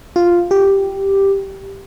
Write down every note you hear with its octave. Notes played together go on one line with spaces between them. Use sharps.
F4
G4